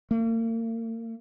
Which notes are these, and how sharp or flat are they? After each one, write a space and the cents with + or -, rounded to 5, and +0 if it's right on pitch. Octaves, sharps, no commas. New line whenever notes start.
A#3 -40